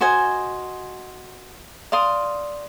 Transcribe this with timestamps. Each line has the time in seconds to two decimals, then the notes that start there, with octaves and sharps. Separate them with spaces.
0.01 F#4 C5 D#5 G#5
1.92 D5 F5 C6 D#6